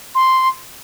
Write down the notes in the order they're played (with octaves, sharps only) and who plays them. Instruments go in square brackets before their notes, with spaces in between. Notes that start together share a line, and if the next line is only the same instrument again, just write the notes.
[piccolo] C6